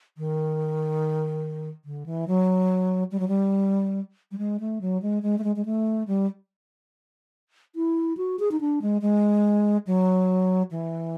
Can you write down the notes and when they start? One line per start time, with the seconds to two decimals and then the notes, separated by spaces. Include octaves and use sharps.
0.18 D#3
1.85 D3
2.06 E3
2.28 F#3
3.11 G3
3.20 F#3
3.28 G3
4.31 G3
4.38 G#3
4.60 A3
4.81 F#3
5.02 G#3
5.23 G#3
5.38 A3
5.44 G#3
5.56 G#3
5.65 A3
6.08 G3
7.76 E4
8.17 F#4
8.39 G#4
8.51 D#4
8.60 D4
8.82 G#3
9.02 G#3
9.87 F#3
10.71 E3